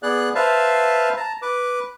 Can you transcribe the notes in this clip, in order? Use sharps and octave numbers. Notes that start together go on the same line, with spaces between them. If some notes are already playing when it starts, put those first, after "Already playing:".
B3 G#4 D5 F#6
B4 C5 E5 F5 A5
A5 A#5
B4 D6